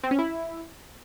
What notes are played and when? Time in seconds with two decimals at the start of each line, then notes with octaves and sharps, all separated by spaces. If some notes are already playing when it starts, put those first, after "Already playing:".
0.03 C4
0.11 C#4
0.19 E4